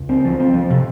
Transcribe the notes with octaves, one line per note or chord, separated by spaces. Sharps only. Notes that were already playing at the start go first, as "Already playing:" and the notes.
Already playing: C#2
C4
F3
C4
F3
C3